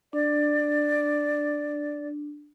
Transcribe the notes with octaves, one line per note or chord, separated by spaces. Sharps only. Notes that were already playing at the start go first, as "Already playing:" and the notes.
D4 D5